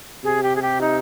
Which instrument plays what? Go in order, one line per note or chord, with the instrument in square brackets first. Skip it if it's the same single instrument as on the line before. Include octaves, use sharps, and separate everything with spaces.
[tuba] C3 [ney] G#4
[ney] G4
G#4
G4
D#4